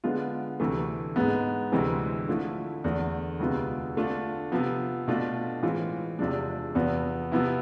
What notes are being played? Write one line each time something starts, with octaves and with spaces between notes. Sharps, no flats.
D3 G#3 B3 F4
D2 C3 E3 A3
G#2 G#3 B3
D2 C3 E3 G#3 C4
D3 F3 A3 E4
E2 D3 A3
D2 C3 G#3 B3 F4
D3 A3 D4 F4
C3 F3 B3
B2 A3 D4 F4
A2 E3 G#3 C4 F4
E2 C3 F3 G#3 D4
E2 C3 F3 B3
C3 F3 B3 E4